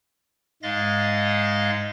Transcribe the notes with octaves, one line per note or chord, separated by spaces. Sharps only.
G#2 G#3 D#5 F5 A6 A#6